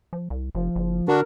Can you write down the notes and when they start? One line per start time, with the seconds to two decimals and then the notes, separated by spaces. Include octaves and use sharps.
0.13 F3
0.30 C2
0.55 F1 F3
0.76 F#1
1.08 D3 D4 F#4 A#4